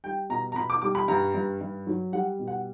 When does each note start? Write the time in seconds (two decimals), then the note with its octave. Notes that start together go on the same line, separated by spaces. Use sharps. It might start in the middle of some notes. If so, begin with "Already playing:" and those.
0.04 G3 G5
0.30 B2 A#5
0.52 A#5
0.56 B2 B5
0.70 D6
0.82 G3 D6
0.95 B5
1.08 G2 A#5
1.34 G2
1.61 G2
1.87 F#3
2.12 G3 F#5
2.39 B2
2.48 F#5